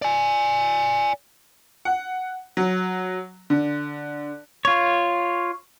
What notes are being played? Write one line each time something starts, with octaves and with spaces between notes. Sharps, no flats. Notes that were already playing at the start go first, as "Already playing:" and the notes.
D5 G#5
F#5
F#3
D3
F4 C#5